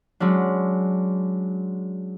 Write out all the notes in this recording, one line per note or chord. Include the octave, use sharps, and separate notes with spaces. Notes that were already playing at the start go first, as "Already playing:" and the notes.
F#3 G#3 C#4 D4